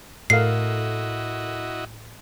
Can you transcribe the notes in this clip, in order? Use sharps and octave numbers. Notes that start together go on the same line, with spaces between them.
A2 E4 F#4 A4 A#4 D#5 F5 C7